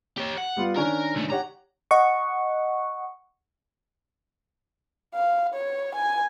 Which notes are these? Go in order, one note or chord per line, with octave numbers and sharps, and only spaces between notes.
G4 C#5
F#5
G3 B3 F4
D#3 C#4 D4 A#4
C2 A3
G4 C#5 F#5 A#5
D#5 F#5 C#6
F5
C#5
G#5